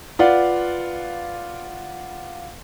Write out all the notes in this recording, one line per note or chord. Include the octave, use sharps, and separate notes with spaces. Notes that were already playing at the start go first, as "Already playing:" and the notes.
F4 B4 D5 F5 F#5